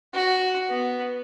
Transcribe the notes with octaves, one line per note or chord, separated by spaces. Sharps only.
F#4
B3